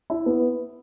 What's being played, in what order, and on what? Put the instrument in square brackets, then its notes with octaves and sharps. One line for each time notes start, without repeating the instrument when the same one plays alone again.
[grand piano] E4
B3